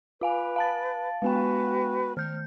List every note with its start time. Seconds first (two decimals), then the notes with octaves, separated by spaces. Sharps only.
0.21 F4 B4 F5 G#5
0.56 F5 A5 A6
1.22 G#3 B3 F#4 B4 G5
2.17 D#3 F6 G6